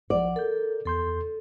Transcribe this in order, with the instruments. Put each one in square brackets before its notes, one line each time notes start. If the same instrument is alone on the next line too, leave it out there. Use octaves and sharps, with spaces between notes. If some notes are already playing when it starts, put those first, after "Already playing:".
[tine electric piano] A#1 F3 [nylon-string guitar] D5 [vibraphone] F#5
[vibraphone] A4 [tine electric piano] A#4 G6
[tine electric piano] E2 C6 G6 [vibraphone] A4